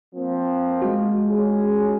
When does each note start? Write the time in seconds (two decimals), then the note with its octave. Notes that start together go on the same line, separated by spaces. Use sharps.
0.15 F3 A#3 C4
0.82 G#3 F#4
1.30 C#4 G#4